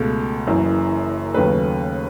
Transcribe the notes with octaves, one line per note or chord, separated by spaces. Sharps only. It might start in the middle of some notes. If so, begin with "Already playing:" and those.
Already playing: C#2 B2 A3
F#1 F#2 E3
D#2 C#3 F#3 A3 B4